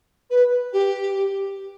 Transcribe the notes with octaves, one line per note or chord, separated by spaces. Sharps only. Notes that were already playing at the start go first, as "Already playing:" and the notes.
B4
G4